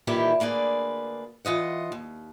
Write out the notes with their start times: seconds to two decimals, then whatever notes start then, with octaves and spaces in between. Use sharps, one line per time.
0.07 A#2 D#3 E3 G3 E4 G4
0.40 D2 A#3 G#4 B4 D5
1.45 E3 F4 D#5 F#5
1.92 D#2